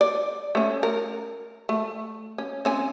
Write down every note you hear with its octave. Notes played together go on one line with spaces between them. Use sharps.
D5
A3 C#4
A#4
A3
C#4
C4 C#4 G#5